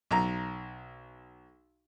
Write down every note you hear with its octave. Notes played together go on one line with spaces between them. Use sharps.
B1 A#5